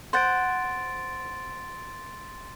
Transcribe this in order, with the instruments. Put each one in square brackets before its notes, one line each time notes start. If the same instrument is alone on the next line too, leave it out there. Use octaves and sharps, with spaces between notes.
[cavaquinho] C5 F#5 [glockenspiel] C6 A6 D7